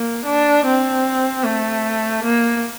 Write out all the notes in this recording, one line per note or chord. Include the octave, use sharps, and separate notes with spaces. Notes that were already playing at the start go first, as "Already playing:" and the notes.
Already playing: A#3
D4
C4
A3
A#3